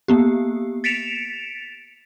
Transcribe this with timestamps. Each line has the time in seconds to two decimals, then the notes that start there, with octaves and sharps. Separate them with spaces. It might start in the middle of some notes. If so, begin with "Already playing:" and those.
0.08 A#3 B3 G4
0.84 A6 B6 C#7 D7 E7 F7